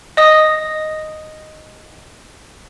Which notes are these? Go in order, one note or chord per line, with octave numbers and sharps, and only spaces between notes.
D#5 D#6 A#6